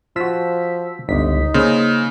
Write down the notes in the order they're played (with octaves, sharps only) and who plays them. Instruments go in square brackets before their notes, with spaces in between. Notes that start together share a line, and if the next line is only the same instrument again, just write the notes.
[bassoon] F3 [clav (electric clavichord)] F4 F#4 [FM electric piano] E6 B6
[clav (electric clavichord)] G1 [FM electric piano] C#2 B6 [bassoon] D#4
[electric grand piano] C#3 [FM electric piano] A#3 [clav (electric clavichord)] C5